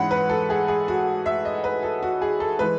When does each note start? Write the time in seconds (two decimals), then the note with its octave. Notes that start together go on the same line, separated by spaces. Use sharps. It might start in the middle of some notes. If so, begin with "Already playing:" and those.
Already playing: G#2 E3 G#3 C#4 F#5 B5
0.11 B4
0.29 A4
0.50 G#4
0.68 G#4
0.88 F#4
1.26 E5
1.45 D#5
1.64 B4
1.83 A4
2.02 F#4
2.22 G#4
2.40 A4
2.59 E3 G#3 B4